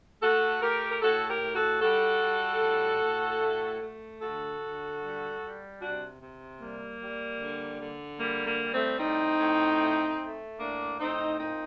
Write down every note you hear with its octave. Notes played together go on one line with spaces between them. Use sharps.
A3 F#4 A4
A3 G4 A#4
A#4
A2 F#4 A4
G4 A#4
A2
F#4 A4
G3 F#4 A4
G3
A2
A2
A3
A3
D3 F#4 A4
D3
G3
G3
C3 D4 F#4
C3
G3 A#3
G3
D3
D3
G3 A#3
A#3
G3
A3 C4
A2 C4 D#4
A2
A3
A3
A2 A#3 D4
A2 C4 D#4
A#2 C4 D#4